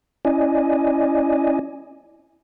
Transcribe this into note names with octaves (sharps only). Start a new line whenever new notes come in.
C#4 E4 D5 D#5 G#5